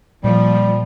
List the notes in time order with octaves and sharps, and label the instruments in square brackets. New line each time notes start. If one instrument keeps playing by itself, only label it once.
[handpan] A#2 [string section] F3 [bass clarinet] G3